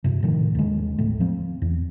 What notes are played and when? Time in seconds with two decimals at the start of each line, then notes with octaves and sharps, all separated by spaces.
0.04 G2 C3
0.23 A2 D#3 F3
0.55 D#2 D3 G#3
0.98 D#1 A1 A2 A3
1.20 F3 C4
1.62 E2